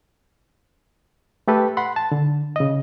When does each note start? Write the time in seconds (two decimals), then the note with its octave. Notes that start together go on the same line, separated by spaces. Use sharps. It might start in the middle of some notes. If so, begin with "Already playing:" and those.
1.48 A3 G4 A4 B4
1.77 F#5 B5 C6
1.96 A5
2.12 D3
2.56 C#3 D#5